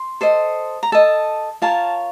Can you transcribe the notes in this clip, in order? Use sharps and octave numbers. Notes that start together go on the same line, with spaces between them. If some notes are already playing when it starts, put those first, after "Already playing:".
Already playing: C6
A4 C5 D#5
A#5
A4 D#5 A5
F4 A#4 C#5 A5